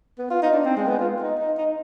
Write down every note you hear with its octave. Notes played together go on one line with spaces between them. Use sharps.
B3
F4
D#4
D4
C4
G#3
B3
F4
D#4
D#4
D#4